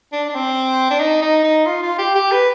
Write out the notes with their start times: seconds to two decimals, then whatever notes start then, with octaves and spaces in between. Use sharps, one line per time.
0.13 D4
0.29 D4
0.35 C4
0.90 D4
1.00 D#4
1.22 D#4
1.44 D#4
1.66 F4
1.83 F4
1.98 G4
2.15 G4
2.32 B4